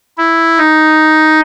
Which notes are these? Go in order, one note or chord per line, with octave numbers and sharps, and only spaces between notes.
E4
D#4